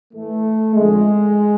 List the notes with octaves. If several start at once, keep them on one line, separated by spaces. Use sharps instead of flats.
A2 E3 A3
F2 D3 F3 G#3